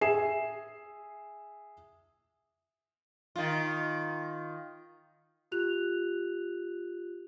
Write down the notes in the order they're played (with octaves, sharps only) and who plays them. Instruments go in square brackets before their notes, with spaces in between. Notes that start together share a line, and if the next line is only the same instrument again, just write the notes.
[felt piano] G#4 E5 C7 E7
[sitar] D#3 F4
[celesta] F4 G4 F#6 F7